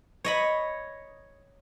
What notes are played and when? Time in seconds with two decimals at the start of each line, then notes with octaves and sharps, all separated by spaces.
0.24 C#5 D#5 B5